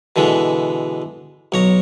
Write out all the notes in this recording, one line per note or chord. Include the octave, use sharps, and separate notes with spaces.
B2 D3 E3 G#3
B1 C#5 A#5